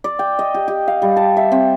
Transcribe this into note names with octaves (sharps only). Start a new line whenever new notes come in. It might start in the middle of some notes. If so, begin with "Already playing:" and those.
D5
G5
D#5
G4
G4
F5
G3
A5
E5
C4